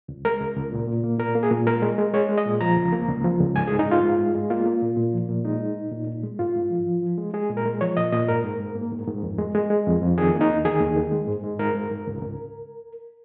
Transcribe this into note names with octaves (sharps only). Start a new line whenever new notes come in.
C#2
G#3 A#4
C#2
C#2
A#2
A#2
A#3
A#2 A#4
A#3
G#4
A#2
G#3 A#4
G#3
G#3
G#3 C#5
G#3
D#5
A#2
F3 A#5
C#2
A#3
C#2
F3
C#2
G#2 G#5
G#4
G#2
D#4
G#2 F4
G#2
G#3
G#3
A#3 F4
A#3
A#2
A#2
F3
A#2
G#3 D#4
G#3
A#2
A#2
A#2
G#3
G#2 F4
G#2
F3
F3
F3
G#3
G#3 G#4
A#2
A#4
G#3
F3 C#5
A#2 D#5
A#2 D#5
G#2 A#4
G#2
G#2
A#3
G#2
G#2
F2
G#3
G#3
G#3
F2
F2
D#3 G#4
A#3
D#4
D#2
D#3 G#4
D#2
D#3
G#3
G#2
G#3
G#2 A#4
G#2
G#2
C#2
C#2